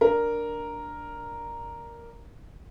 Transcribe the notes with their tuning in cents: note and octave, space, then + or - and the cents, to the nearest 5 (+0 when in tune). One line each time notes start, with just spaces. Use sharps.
D4 +0 A#4 +0